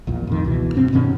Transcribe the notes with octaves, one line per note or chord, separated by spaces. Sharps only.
A#1 E2 A#2
F2 A2 D#3
C#2 B2 E3
D1 G2 B2 C4
G2 B2 D#3 C#4